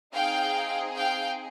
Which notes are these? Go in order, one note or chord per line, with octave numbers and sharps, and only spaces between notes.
C4 D#4 G#4 F5 G5
F5 G5